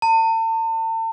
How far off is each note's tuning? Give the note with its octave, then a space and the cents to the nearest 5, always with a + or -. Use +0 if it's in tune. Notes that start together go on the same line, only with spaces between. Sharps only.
A5 +40